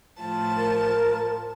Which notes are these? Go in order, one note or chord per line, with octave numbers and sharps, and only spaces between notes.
A2 F3 A5
A#4